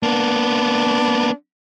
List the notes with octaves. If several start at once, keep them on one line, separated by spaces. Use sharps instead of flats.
A#3 B3 D4